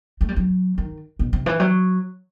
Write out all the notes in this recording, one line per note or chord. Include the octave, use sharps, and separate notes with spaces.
A3
G3
F#3
D#3
B2
C3
E3
F#3